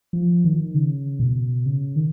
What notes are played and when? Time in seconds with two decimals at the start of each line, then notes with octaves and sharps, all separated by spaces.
0.13 F3
0.44 D#3
0.74 C#3
1.20 B2
1.66 C#3
1.96 D#3